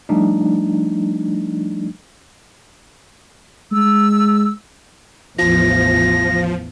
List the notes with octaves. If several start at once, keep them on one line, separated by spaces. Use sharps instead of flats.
F3 G3 A3 D4 D#4
G#3 E6
A1 E2 F3 A#6